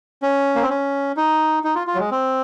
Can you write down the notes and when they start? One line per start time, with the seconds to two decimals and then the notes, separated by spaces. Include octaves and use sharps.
0.22 C#4
0.55 A#3
0.62 C4
0.70 C#4
1.17 D#4
1.64 D#4
1.75 F4
1.87 F4
1.95 F#3
1.99 G#3
2.11 C4